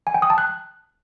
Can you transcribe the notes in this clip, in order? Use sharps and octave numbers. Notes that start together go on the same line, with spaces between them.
G#5
G5
D#6
A5
F#6